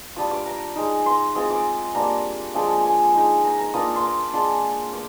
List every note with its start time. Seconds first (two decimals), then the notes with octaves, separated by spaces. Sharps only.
0.16 G3 D4 F4 D#6
0.31 D6
0.46 A#5
0.76 G#3 D#4
1.06 C6
1.35 G#3 C4 F4 D#6
1.51 D6
1.95 G3 A#3 D4 A#5
2.54 F3 G#3 D4 F4 G5
2.85 G#5
3.15 G#3 D#4
3.44 A#5
3.59 A#5
3.74 A#3 D4 F4 D#6
3.96 C6
4.03 D6
4.33 G#3 D4 F4 C6
4.93 D6